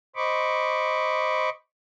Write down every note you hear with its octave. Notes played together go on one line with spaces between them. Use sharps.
C5 D#5 B5 C#6 D6